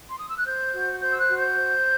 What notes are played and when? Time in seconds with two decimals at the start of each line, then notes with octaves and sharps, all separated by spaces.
0.09 C6
0.18 D#6
0.27 E6
0.37 F#6
0.45 C5 G6
0.73 F#4
1.00 C5 G6
1.11 E6
1.19 F#6
1.29 F#4
1.37 G6
1.56 C5